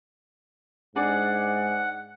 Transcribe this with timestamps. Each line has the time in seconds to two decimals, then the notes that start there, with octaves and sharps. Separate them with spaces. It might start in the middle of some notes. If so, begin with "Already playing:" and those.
0.96 G#2 D4 G#4 D5 F#5